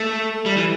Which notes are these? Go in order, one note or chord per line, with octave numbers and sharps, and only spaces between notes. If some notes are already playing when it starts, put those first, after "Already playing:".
Already playing: A3
G3
E3